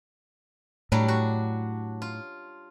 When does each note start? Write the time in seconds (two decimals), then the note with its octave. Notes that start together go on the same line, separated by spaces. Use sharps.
0.92 A2 F#3 G3 D4
1.08 F#4
2.02 F4